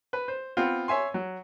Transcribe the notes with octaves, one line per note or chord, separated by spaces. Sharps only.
B4
C5
B3 C4 F4
C#5 E5 G#5 C6
F#3